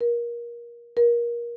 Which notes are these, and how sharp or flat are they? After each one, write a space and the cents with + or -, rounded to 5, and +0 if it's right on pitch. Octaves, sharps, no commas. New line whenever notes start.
A#4 +25
A#4 +25